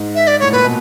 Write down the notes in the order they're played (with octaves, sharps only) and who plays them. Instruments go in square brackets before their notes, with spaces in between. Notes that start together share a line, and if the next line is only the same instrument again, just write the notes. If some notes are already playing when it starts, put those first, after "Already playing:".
Already playing: [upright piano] G#2
[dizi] E5
D5
[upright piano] A2 [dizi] C#5
[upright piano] A#2 [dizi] B4
[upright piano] B2